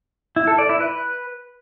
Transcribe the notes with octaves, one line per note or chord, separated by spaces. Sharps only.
E4
A4
D5
E4
B4